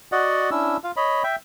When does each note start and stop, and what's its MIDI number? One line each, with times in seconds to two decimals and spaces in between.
0.12 0.50 66
0.12 0.50 74
0.12 0.50 75
0.12 0.50 78
0.51 0.77 61
0.51 0.77 62
0.51 0.77 64
0.51 0.77 88
0.84 0.92 65
0.84 0.92 77
0.96 1.23 73
0.96 1.23 75
0.96 1.23 83
1.24 1.36 76
1.24 1.36 79